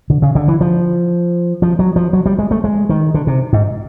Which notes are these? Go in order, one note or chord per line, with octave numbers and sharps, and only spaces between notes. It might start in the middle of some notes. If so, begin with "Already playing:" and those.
D3
C#3
D3
E3
F3
F3
F#3
F3
F#3
G3
G#3
A3
G#3
D#3
D3
C3
G#2